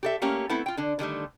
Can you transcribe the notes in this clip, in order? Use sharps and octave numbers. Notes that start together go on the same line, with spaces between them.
G4 A4 E5
A3 A#3 C#4 G4
A3 B3 C4 E4 A4
F4 G5
D3 D4
D3 D#3 G3 A3